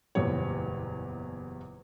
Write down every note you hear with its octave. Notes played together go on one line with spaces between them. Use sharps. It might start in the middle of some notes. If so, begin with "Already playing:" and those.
F#1 E2 A#2 G3 C#5